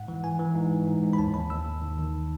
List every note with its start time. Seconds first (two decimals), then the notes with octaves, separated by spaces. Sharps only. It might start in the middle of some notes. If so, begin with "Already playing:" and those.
Already playing: G#2 F#5
0.08 E3
0.24 E3 G#5
0.39 E3
0.55 G#2
0.71 E3
0.87 G#2
1.03 G#2
1.13 B5
1.18 D#2 A5
1.34 D#2 B5
1.50 D#2 E6
1.66 D#2
1.82 D#3
1.98 D#3